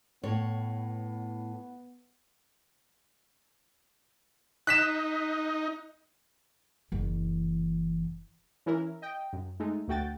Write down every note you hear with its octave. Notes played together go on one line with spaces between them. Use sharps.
A2 B3 C#5
D#4 F#6 B6 E7
F#1 E3
E3 C#4 E4 A#4
D#5 G5
F#2
G#3 A3 D#4
D2 A3 F#4 G5 A6